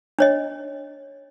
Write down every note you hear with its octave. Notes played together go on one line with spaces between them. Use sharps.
D4 C#5 D#5